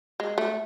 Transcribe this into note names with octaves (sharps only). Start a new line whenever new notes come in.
G#3
A3